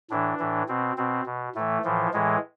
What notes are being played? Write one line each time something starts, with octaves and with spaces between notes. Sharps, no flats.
A2 E3 D4
A2 E3
B2 C4
B2 C4
B2
A2 E3 A3
A2 E3 F3
A2 E3 G#3